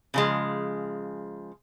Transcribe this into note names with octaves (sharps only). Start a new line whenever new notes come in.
C#3 F3 G#3